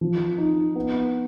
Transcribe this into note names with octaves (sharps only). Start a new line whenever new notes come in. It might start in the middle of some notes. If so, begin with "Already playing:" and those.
F3
D#4
B3